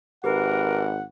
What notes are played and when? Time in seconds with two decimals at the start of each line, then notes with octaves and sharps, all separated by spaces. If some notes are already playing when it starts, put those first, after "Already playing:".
0.24 G#1 G4 A#4 B4 F#5